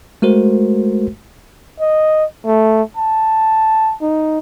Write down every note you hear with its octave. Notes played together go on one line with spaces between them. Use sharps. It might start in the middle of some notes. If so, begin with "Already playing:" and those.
G#3 A3 F#4 A#4 C5
D#5
A3
A5
D#4